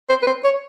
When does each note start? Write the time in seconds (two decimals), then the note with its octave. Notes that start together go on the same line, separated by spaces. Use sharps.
0.09 C5
0.22 B4
0.27 C5
0.44 C#5